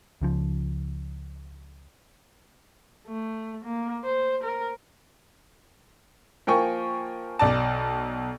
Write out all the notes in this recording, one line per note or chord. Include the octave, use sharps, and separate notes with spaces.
C#2 C#3 F3
A3
A#3
C5
A#4
F3 A#3 A#4 G5 G#5 C#6
B1 D5 A5